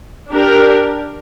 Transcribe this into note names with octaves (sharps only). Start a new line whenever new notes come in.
D4 G4 A#4